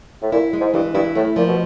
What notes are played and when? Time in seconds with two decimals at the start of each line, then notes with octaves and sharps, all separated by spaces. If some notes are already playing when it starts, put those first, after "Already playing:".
0.22 A2
0.32 A#2 E4
0.53 G#3
0.61 G#2
0.74 G2 E3
0.94 G2 E4
1.15 A2 A3
1.36 A#2 F3
1.48 B2